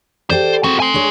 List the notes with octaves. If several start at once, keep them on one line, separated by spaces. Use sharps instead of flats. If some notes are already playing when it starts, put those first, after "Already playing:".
G4 A4 C5 D5
C4 F#4 G#4
G#5 C6
D4 G#4 C#5